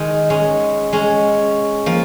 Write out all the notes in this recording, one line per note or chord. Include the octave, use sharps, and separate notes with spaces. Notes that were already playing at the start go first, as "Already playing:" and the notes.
Already playing: D#3 G#3
G#3 C#4
G#3 C#4
F3 A#3